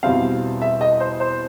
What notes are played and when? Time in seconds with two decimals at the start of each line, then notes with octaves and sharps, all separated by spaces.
0.03 E2 B2 G3 C4 F5
0.62 E5
0.81 D#5
1.00 C5
1.20 C5